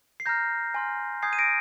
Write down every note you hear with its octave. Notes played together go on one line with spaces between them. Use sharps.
C7
A#5 F6 G6 A#6
G#5 C6 F6
G#5 D#6 G6 G#6 C7
D#7
A#6 D7